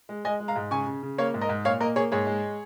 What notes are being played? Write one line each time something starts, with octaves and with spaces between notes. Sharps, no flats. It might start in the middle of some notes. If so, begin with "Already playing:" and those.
G#3
G#3 D#5 G#5
G#3
F5 A#5
G#2
C#3 G#5 C#6
C#3
C#3
A#3 C#5 F5
G#2
A#4 D#5
G#2
A#2 C#5 F5
A#3 A#4 D#5
A#3 G#4 C#5
G#2 G#4 C#5
G#3